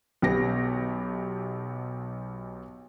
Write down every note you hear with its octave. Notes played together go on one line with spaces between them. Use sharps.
B1 B3 G4 A#6